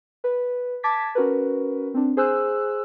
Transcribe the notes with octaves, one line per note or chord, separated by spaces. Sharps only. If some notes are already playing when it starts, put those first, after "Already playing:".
B4
A5 D6 G#6 A6 B6
C#4 F#4 A#4 B4
C4 D4
G#4 C5 G#5 E6 F#6